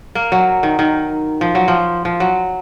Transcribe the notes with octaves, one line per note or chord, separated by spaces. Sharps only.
A#3
F#3
D#3
D#3
F3
F#3
F3
F3
F#3